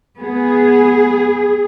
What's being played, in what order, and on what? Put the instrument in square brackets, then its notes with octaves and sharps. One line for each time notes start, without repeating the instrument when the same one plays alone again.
[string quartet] B3 [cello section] G#4